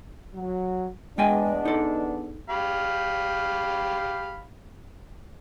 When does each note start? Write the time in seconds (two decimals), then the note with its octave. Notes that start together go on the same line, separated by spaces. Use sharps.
0.35 F#3
1.18 E2 G#3 B3 D4 D#5 G5 G#5
1.65 D#4 A4
2.49 G4 F5 B5